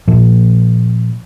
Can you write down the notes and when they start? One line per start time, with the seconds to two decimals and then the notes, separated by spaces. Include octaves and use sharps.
0.08 A#2 F3